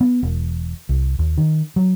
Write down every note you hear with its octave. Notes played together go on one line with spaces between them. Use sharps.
B3
E1
C2
D#2
D#3
F#3